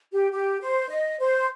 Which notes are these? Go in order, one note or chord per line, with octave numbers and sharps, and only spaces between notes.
G4
G4
C5
D#5
C5